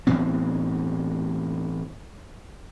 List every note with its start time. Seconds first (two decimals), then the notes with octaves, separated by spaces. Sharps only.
0.07 A2 E3 B3 C4